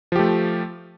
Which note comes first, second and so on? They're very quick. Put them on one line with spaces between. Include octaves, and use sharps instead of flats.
F3 G4 A3